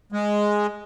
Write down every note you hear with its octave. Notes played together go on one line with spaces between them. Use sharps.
G#3